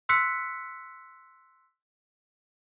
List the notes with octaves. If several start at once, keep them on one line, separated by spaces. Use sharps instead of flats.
C6 E6 F#6 B6 C#7